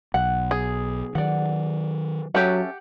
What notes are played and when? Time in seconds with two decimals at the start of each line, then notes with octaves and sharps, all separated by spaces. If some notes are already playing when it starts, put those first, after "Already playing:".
0.14 B1 F#5
0.51 G#4
1.15 D#3 F#3 D5 F#5
2.35 F#3 C#4 G4 A4 E5 F#5